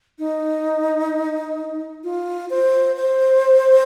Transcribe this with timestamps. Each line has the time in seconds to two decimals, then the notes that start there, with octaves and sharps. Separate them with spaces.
0.19 D#4
2.04 F4
2.50 C5
2.96 C5